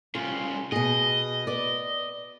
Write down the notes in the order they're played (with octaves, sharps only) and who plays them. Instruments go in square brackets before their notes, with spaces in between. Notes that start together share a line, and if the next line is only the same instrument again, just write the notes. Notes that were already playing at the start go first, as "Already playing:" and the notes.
[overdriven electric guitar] C2 C#3 [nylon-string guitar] F4
[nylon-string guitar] B2 G#4 [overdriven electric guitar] D#5
[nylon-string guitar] B4 D5